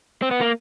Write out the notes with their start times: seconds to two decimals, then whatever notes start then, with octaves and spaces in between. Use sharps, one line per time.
0.22 C4
0.31 B3
0.41 A#3